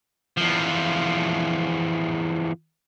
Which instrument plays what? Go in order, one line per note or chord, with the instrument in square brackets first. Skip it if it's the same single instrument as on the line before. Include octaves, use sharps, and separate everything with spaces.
[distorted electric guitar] E2 F3